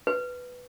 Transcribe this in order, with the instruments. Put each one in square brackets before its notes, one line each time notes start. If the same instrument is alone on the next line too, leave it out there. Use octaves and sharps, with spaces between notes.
[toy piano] B4